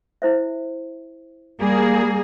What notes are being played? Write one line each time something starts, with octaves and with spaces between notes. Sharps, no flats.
E4 C5 E5
G3 A#3 G#4